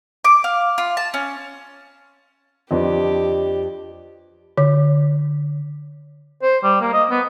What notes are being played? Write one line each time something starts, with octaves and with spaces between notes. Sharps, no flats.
D6
F5
F4
A5
C#4
F2 D4 G4 B4 D#5
D3
C5
G3
A#3
D#5
B3